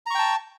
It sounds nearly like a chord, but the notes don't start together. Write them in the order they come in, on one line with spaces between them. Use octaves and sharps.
A#5 C#6 G5 A5